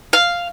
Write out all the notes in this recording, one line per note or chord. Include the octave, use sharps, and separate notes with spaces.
F5